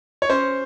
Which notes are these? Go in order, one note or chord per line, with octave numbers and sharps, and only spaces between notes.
C#5
C#4 C5